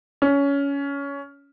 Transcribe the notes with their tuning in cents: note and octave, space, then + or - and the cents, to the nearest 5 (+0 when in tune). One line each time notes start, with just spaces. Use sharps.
C#4 +20